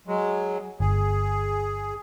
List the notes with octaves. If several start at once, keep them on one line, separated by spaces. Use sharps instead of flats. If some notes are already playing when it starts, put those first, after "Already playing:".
F#3 G#3
G1 G#4